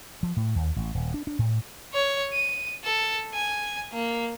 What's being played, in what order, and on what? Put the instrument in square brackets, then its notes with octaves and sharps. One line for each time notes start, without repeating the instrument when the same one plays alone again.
[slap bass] F3
A2
D#2
A1
D#1
D4
D4
A2
[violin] C#5
D#7
A4
G#5
A#3